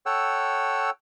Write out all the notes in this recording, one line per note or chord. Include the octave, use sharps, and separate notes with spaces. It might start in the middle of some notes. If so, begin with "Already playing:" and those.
A4 C#5 F#5 G5 E6